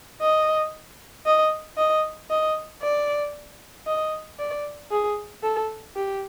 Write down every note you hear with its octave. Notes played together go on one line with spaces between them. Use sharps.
D#5
D#5
D#5
D#5
D5
D#5
D5
G#4
A4
G4